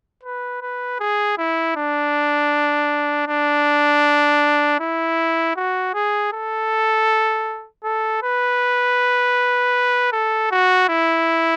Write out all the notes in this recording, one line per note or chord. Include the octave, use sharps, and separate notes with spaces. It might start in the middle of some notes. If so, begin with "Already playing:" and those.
B4
B4
G#4
E4
D4
D4
E4
F#4
G#4
A4
A4
B4
A4
F#4
E4